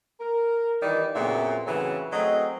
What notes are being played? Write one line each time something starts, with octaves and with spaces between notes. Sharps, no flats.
A#4
D#3 E3 G3 D#4 F4 D5
F2 A#2 C#3 F#3 B3 E5
A2 C#3 E3 F#3 C4 B4
F#3 A3 C4 G#4 D#5